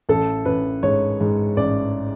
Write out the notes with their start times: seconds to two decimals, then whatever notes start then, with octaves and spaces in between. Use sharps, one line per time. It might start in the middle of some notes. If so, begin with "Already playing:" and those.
0.09 A1 A4
0.45 A1 B4
0.83 G#2 C#5
1.21 G#2
1.57 A1 D5